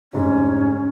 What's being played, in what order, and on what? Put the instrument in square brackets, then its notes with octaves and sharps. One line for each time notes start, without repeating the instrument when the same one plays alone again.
[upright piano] F1 G#2 D3 [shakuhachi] C#4